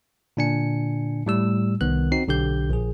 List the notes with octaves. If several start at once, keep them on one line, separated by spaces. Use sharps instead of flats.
A#2 D3 D4 G#5 C#7
A2 G3 E6
C2 D#3 B3 F#6
C4 D#4 F#4 C7
B1 D3 G4 G6
A#1 G#4